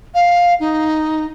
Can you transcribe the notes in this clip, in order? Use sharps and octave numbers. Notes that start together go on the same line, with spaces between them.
F5
D#4